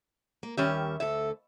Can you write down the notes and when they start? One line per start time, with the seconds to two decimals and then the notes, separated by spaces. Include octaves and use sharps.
0.43 A#3
0.57 D#2 D#3 G3 C#4 G4 E5
1.00 D2 D3 A4 E5